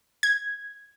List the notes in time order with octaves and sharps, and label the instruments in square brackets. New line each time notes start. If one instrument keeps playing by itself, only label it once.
[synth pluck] G#6